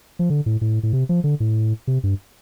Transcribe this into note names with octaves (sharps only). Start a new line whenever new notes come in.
F3
D3
A2
A2
A2
C3
F3
D3
A2
C3
G2